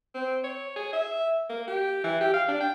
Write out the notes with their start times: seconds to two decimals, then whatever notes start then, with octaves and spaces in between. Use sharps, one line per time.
0.15 C4
0.44 C#5
0.76 G#4
0.93 E5
1.50 A#3
1.68 G4
2.04 E3
2.21 G4
2.34 F5
2.48 D4
2.61 G5